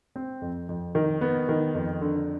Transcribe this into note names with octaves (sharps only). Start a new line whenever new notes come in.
C4
F2
F2
D#3
B3
D#3
F2
D3